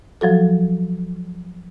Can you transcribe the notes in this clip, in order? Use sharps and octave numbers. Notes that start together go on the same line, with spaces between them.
F3 F#3 F#4 A4